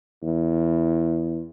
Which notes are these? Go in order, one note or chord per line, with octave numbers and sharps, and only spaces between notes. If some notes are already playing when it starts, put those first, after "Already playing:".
E2